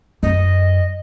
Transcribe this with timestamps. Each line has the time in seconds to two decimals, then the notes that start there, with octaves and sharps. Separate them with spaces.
0.23 F#2 D#5